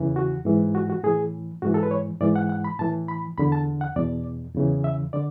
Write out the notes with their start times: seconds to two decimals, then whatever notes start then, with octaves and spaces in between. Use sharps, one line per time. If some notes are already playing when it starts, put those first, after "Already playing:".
Already playing: E2 C#3 E3
0.16 F#4
0.45 G#2 E3
0.75 F#4
0.90 F#4
1.03 A2 E3 G#4
1.62 G#2 E3 F#4
1.74 A4
1.83 B4
1.91 C#5
2.21 G#2 E3 D5
2.36 F#5
2.49 F#5
2.64 B5
2.79 A2 E3 A5
3.08 B5
3.38 E2 D3 B5
3.52 A5
3.81 F#5
3.96 E2 B2 D5
4.55 E2 C#3 E3
4.84 E5
5.13 D3 D5